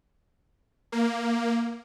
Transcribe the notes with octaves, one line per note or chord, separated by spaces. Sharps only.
A#3